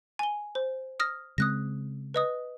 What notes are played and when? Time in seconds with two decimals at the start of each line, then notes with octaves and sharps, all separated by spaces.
0.19 G#5 G7
0.55 C5
1.00 D#6 F6 A#6
1.38 C#3 G#3 C4 D#6 F#6 A#6
2.14 B4 D#5 D#6